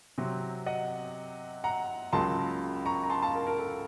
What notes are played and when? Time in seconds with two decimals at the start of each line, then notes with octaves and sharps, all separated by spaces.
0.18 C3 F#3 C4
0.66 D#5 F#5
1.64 F#5 A#5
2.13 C#2 C#3 F#3 A#3 A5 C6
2.86 A#5 C#6
3.04 A#5
3.10 A5 C6
3.22 F5 A5
3.35 A#4
3.47 A#4
3.59 A4